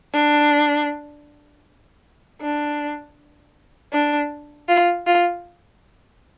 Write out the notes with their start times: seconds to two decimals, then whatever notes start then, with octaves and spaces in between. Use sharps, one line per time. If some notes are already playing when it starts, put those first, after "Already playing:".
0.13 D4
2.41 D4
3.93 D4
4.69 F4
5.07 F4